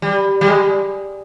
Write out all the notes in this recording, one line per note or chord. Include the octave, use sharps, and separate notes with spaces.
G3
G3
G#3